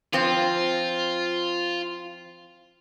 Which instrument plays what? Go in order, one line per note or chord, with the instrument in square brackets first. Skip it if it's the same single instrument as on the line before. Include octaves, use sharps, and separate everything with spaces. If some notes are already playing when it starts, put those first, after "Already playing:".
[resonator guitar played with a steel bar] F3 C4 [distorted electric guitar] F4